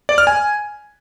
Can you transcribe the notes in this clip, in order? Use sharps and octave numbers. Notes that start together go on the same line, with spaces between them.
D5
F6
G#5